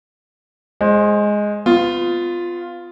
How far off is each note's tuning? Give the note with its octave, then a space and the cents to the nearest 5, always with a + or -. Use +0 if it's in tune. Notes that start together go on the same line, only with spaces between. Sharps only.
G#3 +0 C5 +20
B3 +35 F4 +0